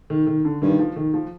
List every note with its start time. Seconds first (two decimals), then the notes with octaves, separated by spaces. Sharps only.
0.10 D#3
0.27 D#3
0.45 D3
0.62 G2 D#3
0.79 F3
0.96 D#3
1.14 F3